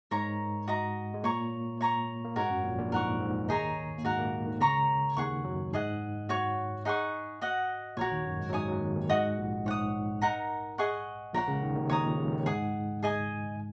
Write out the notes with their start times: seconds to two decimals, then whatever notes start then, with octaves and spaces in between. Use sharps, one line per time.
0.11 G#2 G#3 A#4 C#5 A#5
0.68 F#4 D#5 A#5
1.14 G#3
1.23 A#2 A#3 C#5 A#5 C#6
1.81 C#5 A#5 C#6
2.25 A#3
2.36 G#2 G#3 F#4 A#4 C#5 F#5
2.50 F#2 F#3
2.64 A#1 A#2
2.78 A#1 A#2
2.92 G#2 A#4 F#5 C#6
3.20 G#2
3.48 D#2 D#3 D#4 G#4 C#5 A#5
3.98 A#3
4.05 G#2 G#3 F#4 A#4 F#5
4.18 A#2 A#3
4.47 D#2 D#3
4.60 C#2 C#3 A#4 C#5 A#5 C#6
5.17 D#2 D#3 G#4 F#5 C#6
5.44 F#2 F#3
5.73 G#2 G#4 D#5 F#5
6.29 F#4 C#5 F#5 C#6
6.85 D#4 G#4 F#5 C#6
7.41 F#4 D#5 F#5
7.97 A#1 A#2 F#4 A#4 C#5
8.11 D#2 D#3
8.25 F#2 F#3
8.39 G#2 G#3
8.50 F#3
8.53 G#2 G#3 C#5 G#5 D#6
8.68 F#2 F#3
8.81 D#2 D#3
8.96 D#2 D#3
9.09 G#2 G#3 F#4 D#5 F#5 D#6
9.37 A#1 A#2
9.66 G#2 C#5 F#5 D#6
10.21 D#4 A#4 F#5 A#5
10.78 G#4 D#5 F#5 C#6
11.34 A#1 A#2 A#4 C#5 F#5
11.48 C#2 C#3
11.62 D#2 D#3
11.76 D#2 D#3
11.90 D#2 D#3 C#5 A#5 D#6
12.04 A#1 A#2
12.18 C#2 C#3
12.32 D#2 D#3
12.46 G#2 G#3 G#4 F#5 D#6
13.03 G#4 D#5 G#5 D#6